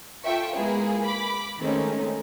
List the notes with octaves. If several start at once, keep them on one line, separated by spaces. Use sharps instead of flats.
F4 A4 E5 G5 C#6
G#3 A#3 B3 E4 F4 G#4
B5 D6
D#3 G#3 A3 C4 C#4 D#4